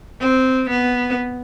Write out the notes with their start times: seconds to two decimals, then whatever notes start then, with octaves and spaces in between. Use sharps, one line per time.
0.20 C4
0.70 B3